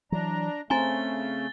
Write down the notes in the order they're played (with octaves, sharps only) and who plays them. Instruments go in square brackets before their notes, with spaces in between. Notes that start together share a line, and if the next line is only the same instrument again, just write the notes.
[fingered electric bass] E3 F#3 [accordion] D4 A#5
[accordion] C#3 A3 [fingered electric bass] C4 [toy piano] G#5 A#5 C6 [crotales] A6 G7